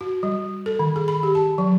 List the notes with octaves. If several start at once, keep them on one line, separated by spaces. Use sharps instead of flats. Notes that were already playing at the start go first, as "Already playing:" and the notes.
F#4
G3
A4
D#3
G#4
B5
G4
A5
F#3